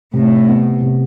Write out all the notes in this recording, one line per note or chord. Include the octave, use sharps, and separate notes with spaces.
A2 C3
B3
C3